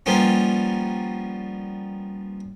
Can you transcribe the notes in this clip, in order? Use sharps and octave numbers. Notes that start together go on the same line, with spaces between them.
F3 G3 A#3 B3 C#4